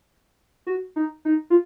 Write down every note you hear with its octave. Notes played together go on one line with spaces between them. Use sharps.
F#4
D#4
D#4
F4